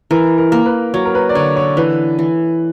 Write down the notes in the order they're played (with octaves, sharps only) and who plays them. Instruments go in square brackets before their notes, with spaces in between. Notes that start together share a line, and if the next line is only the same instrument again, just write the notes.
[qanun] E3 [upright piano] A#4
[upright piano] A#4
[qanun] A#3
[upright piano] B4
[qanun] F#3 [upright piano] C#5
[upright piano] A#4
B4
D5
[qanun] D3 [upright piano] C#5
[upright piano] C#5
[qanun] E3 [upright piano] B4
[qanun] E3